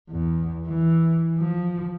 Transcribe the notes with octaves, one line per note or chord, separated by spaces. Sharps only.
E2
E3
F3